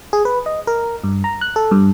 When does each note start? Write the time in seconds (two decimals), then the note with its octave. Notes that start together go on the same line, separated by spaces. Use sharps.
0.13 G#4
0.25 B4
0.46 D#5
0.67 A#4
1.04 G2
1.24 A#5
1.41 F#6
1.56 A4
1.71 G2